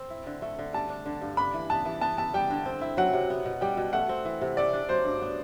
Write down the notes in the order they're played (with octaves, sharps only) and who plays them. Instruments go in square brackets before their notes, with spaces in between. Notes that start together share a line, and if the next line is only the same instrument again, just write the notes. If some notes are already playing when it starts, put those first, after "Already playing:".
Already playing: [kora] C4
E4
D3
A3
D3
[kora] G3 [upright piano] A5
[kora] D4
D3
G2
[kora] D4 [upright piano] B5
[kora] E3
[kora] B3 [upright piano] A5
[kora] E3
[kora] B3 [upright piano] A5
[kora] E4 [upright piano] A5
[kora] G3 [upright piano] G5
[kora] D3
C4
E4
[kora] F#3 [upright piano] F#5
[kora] C3
B3
B2
[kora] G3 [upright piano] G5
[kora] B2
[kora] A3 [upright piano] F#5
[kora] C4
E3
C3
[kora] A3 [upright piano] D5
[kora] D4
[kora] F#3 [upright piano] C5
[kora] G2
B3